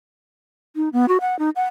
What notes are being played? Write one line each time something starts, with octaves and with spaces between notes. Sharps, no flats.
D#4
B3
F#4
F#5
D#4
F#5